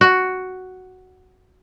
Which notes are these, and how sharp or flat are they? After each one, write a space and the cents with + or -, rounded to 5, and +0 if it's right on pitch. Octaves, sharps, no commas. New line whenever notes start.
F#4 +5